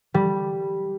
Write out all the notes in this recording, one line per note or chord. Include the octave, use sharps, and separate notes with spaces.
G3